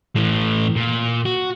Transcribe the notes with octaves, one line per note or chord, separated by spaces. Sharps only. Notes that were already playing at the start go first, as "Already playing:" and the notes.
A2 E3
A#2
F#4